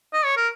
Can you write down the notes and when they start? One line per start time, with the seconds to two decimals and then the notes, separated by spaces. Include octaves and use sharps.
0.14 D#5
0.25 C#5
0.37 A#4